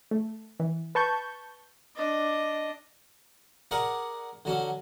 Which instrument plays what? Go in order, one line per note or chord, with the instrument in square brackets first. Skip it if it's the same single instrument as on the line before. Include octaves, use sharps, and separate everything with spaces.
[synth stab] A3
E3
B4 A5 C#6 G6
[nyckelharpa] D4 D#5
[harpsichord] G#4 A#4 D5 F#5
D3 F#3 C#4